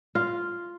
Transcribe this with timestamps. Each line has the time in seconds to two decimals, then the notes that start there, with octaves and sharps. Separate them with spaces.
0.15 F4